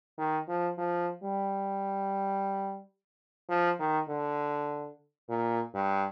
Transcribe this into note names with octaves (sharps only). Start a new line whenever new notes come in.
D#3
F3
F3
G3
F3
D#3
D3
A#2
G2